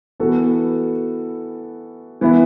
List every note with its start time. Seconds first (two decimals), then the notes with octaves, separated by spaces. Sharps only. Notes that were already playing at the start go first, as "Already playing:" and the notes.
0.20 E3 B3 F#4 A4
2.21 E3 B3 E4